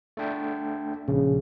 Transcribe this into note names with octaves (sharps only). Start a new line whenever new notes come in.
A3 D4 G5
A#1 C#3